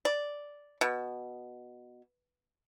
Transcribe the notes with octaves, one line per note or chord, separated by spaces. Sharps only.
D5
B2